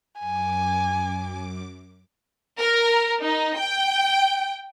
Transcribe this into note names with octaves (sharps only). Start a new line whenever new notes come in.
F#2 G#5 D6
A#4
D#4
G5